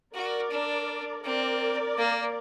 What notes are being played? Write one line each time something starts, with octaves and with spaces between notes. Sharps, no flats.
F#4 A#4 D5
D4
C4 A#4 D5
A#3